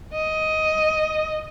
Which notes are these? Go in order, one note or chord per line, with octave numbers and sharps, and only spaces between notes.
D#5